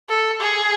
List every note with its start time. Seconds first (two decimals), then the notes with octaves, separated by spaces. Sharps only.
0.09 A4
0.40 G#4